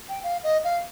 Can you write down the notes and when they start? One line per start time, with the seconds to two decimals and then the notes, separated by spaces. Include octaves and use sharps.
0.09 G5
0.23 F5
0.44 D#5
0.64 F5